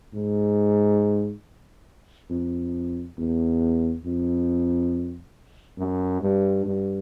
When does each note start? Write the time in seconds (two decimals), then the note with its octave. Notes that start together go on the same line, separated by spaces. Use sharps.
0.14 G#2
2.30 F2
3.18 E2
4.05 F2
5.78 F#2
6.22 G2
6.65 G2